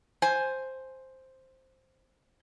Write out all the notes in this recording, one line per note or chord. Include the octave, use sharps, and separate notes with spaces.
C5 G#5